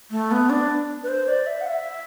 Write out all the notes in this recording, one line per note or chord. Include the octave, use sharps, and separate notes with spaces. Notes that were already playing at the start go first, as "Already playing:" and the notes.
A3
B3
D4
B4
C5
D5
E5
F#5
E5